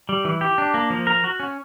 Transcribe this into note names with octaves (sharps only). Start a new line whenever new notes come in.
G3
E3
G4
D4
A#3
F3
A#4
F#4
C#4